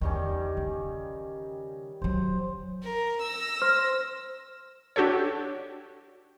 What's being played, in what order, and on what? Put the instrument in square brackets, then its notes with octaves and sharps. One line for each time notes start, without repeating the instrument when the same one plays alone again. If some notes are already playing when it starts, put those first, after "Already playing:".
[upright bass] E2 D3 [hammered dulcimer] D#3 G3 C#4
[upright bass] C#3
[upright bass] F#2 F#3 [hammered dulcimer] C5
[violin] A#4
E6 A#6
[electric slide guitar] C5 [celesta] F6
[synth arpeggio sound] D4 F#4 G4 A4 C#5